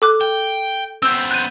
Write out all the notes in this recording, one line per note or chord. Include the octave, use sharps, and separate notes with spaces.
A4 D6 F#6
G5
B3 C4 E6 G6
F#6 G6 D#7